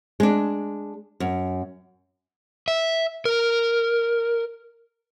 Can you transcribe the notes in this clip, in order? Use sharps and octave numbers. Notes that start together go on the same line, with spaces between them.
G#3 D4
F#2
E5
A#4